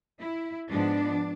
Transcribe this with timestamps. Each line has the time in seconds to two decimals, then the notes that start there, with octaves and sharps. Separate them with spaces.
0.19 E4
0.69 G#2 F3 G#3 B3 D4